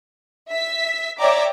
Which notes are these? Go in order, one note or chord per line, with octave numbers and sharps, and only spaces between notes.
E5 B6
C#5 D5 E5 G5 A#5 D6